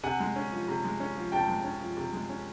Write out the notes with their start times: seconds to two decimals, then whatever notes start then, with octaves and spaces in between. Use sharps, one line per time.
0.04 C3 F#5 G#5
0.20 G#3
0.36 C#4
0.52 F3
0.68 C3
0.84 G#3
1.00 C#4
1.16 F3
1.32 C3 G5 A5
1.48 G#3
1.64 C#4
1.81 F3
1.97 C3
2.13 G#3
2.29 C#4